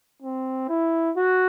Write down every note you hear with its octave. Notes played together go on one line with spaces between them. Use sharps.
C4
E4
F#4